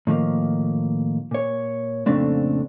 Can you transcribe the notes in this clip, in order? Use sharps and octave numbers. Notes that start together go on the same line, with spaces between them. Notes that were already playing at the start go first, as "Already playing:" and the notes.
A2 D#3 F3 A#3
A#2 C#5
F2 A#2 C#3 A3 C4 D4